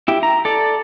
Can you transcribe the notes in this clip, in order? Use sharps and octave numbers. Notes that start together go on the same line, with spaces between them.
E4 G4
A#5
A4 D5